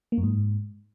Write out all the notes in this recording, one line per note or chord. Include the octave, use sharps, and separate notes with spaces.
A#3
F#2
G#2